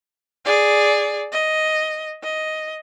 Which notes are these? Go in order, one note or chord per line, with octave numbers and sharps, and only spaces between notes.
G#4 D5
D#5
D#5